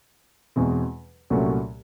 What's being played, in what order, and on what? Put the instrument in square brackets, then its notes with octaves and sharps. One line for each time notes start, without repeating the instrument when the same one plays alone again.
[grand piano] E2 B2 G#3 C4
C2 A#2 F#3 A3 C#4